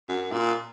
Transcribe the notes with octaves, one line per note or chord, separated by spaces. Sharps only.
F#2
A#2